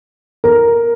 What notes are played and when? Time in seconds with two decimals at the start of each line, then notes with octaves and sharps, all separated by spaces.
0.44 A#4